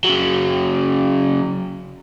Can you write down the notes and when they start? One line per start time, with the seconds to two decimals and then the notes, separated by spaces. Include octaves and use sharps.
0.04 C#3 F#3